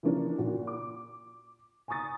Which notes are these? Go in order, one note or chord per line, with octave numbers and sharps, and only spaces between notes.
E3 F3 A#3 C#4 D4
A#2 F#4
D6
G#5 A#5 C#6 D#6 A6